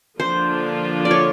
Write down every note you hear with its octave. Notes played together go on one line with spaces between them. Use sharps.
D3 F3 A#3 D4 F4 C5
D5
C#5